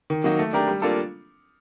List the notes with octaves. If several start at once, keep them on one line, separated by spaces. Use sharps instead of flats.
D#3
F#3 A#3 D#4 F#4
A3
D4 G4 A#4
G3
A#3 D4 F4 A4